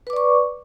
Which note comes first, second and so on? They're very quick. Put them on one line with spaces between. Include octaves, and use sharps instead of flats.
B4 D6 D5 C#6